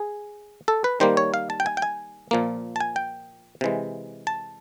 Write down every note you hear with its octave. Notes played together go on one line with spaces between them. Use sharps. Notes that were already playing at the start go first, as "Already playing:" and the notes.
Already playing: G#4
A4
B4
D#3 G3 A#3 C5
C#5
F5
A5
G5
G#5
G5
G#5
A#2 F3 A#3
A5
G#5
G5
C3 E3 G#3
A5